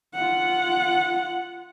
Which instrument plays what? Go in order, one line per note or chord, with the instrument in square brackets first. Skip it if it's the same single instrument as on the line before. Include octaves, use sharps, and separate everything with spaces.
[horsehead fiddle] F4 F#5